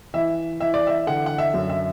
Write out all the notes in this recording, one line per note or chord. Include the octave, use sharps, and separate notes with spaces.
E3 E5
E3 E5
D5
E5
D3 F#5
F#5
E5
F#2
E5